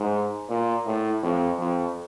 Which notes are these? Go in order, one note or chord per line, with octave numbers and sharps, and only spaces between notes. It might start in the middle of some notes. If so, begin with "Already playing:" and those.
Already playing: G#2
A#2
A2
F2
F2